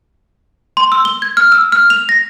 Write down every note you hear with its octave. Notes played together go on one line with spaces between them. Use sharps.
C6
E6
G7
G#6
F6
E6
F6
F7
A#6